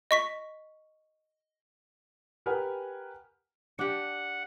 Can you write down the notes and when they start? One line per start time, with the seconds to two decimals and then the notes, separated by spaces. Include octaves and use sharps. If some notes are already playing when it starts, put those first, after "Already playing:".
0.11 D#5 C#6 B6
2.46 G4 A#4 B4 F#5 G#5 F6
3.79 D4 G4 F#5